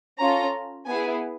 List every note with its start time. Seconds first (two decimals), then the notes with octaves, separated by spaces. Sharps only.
0.19 C#4 F4 A4 A#5
0.86 B3 E4 G#4 G#5